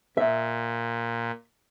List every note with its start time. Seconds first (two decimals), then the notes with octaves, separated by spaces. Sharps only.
0.17 A#2 E5